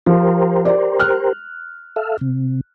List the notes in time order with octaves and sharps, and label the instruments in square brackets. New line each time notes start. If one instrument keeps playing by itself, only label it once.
[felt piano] F3 [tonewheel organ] G4 A#4 C5
[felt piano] D5
F6 F#6
[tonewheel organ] A4 E5 F5
C3